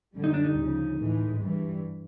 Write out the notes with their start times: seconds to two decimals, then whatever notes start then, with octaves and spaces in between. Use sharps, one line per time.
0.13 F#2 D3 G3
0.24 D#4
0.34 D4
0.44 D#4
0.56 D2 C#3 F3
0.98 A2 E3 G#3
1.40 G2 E3